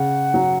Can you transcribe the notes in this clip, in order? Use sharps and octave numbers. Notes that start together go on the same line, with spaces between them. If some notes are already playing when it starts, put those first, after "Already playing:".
Already playing: C#3 F#5
F#3